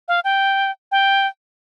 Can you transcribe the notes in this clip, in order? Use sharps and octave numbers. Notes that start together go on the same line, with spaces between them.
F5
G5
G5